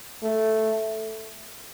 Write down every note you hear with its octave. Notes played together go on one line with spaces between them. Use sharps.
A3